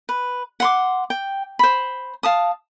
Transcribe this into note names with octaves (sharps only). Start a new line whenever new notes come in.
B4
F#5 C6 D6
G5
C5 B5
F5 A5 D#6